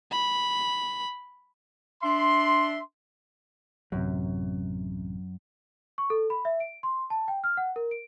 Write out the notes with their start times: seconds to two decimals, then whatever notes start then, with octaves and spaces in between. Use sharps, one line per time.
0.12 B5
2.03 D4 E5 C6
3.92 A1 F#2 C3
5.98 C#6
6.10 A4
6.30 B5
6.45 E5
6.60 D7
6.83 C6
7.10 A5
7.28 G5
7.44 F6
7.57 F#5
7.76 A#4
7.91 D7